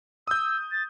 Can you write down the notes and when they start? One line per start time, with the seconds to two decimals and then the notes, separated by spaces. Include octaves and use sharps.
0.27 D#6 E6 G6
0.72 A6